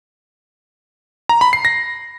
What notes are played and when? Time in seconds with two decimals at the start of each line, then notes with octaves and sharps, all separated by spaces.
1.29 A#5
1.41 B5
1.53 C7
1.65 A#6